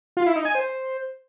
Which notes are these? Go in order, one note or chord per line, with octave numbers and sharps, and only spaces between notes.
F4
E4
D#4
G#5
C5